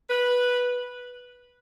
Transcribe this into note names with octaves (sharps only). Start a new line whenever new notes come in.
B4